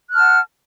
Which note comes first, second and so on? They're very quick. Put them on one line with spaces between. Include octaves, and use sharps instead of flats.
F#6 F6 A5 F#5